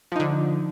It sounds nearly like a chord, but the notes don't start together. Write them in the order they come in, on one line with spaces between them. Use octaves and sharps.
F3 D#4 D3